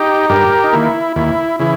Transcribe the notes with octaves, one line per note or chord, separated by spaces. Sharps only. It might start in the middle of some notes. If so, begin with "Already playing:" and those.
Already playing: D#4 G4
G2 G4 A#4
D#4
D#3 A#3 E4
D#2 E4
C#3 E3 E4